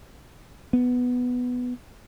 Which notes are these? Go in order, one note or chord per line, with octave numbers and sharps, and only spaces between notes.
B3